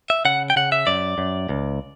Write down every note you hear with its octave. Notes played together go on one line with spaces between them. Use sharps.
E5
C#3 F#5
G5
C#3 F#5
E5
F#2 D5
F#2
C#2